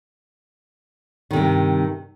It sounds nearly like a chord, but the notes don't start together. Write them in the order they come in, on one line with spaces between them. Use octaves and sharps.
D#3 C3 G2